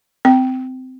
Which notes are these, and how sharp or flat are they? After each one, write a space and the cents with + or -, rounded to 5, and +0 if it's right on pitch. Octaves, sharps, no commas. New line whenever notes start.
C4 -20 G5 -10